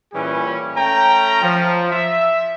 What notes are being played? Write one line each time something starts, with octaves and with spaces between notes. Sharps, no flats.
A#2 E3 G3 C#4 G#4
A3 C#4 G5 A#5
F3
E5